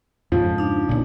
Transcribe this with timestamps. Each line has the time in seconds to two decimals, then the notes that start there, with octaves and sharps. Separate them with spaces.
0.32 F2 G#2 C#3 F3
0.58 D4 D#4
0.89 C#2 A#2